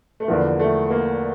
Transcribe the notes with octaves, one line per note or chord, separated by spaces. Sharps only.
A3
E2 D3 F3 A#3
A3
A#3